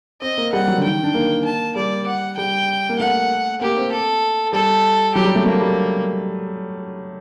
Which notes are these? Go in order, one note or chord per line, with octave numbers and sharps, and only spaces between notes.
C4 D#5
A#3
G3 F#5
F#3
D3
D#3 G5
D#3
D4
A#3
A5
G3 D5
F#5
G3 G5
A#3
A3 F#5
A#3 G4
C4
A4
G3 A4
F#3 G4
G3
A3
A3 A#3
G3